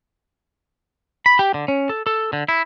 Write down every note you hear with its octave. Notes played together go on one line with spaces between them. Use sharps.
B5
G4
D3
C#4
A4
A4
D3
E4